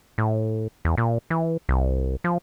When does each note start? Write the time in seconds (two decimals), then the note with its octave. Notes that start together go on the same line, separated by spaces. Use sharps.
0.18 A2
0.85 E2
0.98 A#2
1.30 E3
1.69 C2
2.24 F3